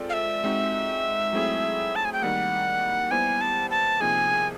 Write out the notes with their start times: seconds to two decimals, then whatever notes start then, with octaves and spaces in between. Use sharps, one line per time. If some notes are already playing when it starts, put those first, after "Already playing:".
Already playing: G#3 C4 F4 A4 D5
0.10 F5
0.13 E5
0.44 G#3 C4 D#4 F#4
1.33 F#3 A3 C4 E4 G#4
1.96 A5
2.05 G#5
2.13 G5
2.22 D#3 G3 A#3 F#5
3.11 G3 B3 E4 G4 C5 G#5
3.41 A5
3.70 A5
4.00 C3 F3 A#3 D#4 G#4 G#5